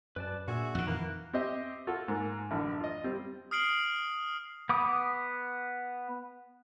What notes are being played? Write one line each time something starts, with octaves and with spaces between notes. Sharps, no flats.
F#2 B4 D5 A5
A#2 D4 F#4 G#4 E5
F2 D#3 F#5
E3 A#3 A#5 F#6
C4 G4 C5 D#5 E5
F4 F#4 A4
G#2 A#3
A1 F#2 D3
F4 D#5
G3 C4
D#6 F6 C7 D7 F#7
B3 D6 D#6